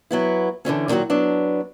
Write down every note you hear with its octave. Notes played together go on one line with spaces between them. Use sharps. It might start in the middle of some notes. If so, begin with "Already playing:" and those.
F#3 B3 E4
D3 E3 F#3 C#4
A#2 D3 D#3 F#3 F#4
F#3 B3 D4